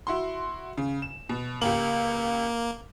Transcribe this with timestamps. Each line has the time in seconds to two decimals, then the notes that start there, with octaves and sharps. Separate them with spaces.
0.07 E4 F#4 C6
0.77 C#3
1.02 E7
1.29 B2
1.61 C#2 A#3 G4 F#7